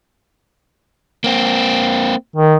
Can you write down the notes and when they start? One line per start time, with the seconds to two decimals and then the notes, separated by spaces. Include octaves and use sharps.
1.24 A#3 C4
2.36 D#3